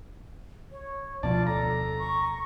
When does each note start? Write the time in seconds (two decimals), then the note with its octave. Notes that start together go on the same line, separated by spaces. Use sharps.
0.71 C#5
1.23 D2 B2 F3 F4 D5 A5
1.47 A4 A#5
1.98 C#6